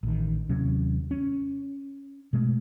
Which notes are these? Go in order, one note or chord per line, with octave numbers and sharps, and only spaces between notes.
A1 D#3
D#2 C3 F#3 C#4
C#4
B2 G#3 A3